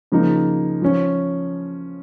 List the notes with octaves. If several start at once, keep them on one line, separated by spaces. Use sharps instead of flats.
C#3 F3 A#3 D#4
F3 C#4